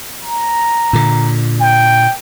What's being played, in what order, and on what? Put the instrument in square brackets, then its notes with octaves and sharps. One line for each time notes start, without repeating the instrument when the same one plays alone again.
[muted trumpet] A#5
[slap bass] A#2 D3
[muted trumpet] G5